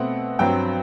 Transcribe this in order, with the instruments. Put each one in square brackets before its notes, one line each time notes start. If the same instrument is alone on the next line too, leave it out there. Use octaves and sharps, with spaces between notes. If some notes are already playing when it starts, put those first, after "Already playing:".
Already playing: [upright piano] B2 A3 C4 F#5
G2 F#3 C4 G5